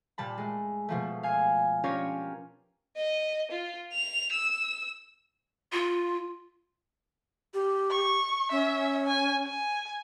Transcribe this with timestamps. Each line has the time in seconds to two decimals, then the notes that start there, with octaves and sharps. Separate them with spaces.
0.18 A#2 G3 A5 B5
0.38 G#3 A3
0.89 B2 F3 A3
1.23 F5 G#5 G#6
1.84 C#4 D4 F4 G4 A#4 C#5
2.97 D#5
3.51 F4
3.93 F7
4.33 E6
5.72 F4
7.54 G4
7.91 C#6
8.51 C#4 E5
9.07 G#5
9.46 G#5